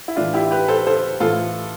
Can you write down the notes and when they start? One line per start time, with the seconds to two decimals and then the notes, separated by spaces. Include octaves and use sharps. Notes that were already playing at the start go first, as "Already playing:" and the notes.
0.08 E4
0.16 A2 E3 D4 F4
0.34 E4 G4
0.51 G4 B4
0.68 A4 C5
0.87 A4 C5
1.20 A2 E3 F4 A4